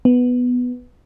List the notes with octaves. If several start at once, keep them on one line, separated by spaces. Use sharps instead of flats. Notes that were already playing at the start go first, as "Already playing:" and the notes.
B3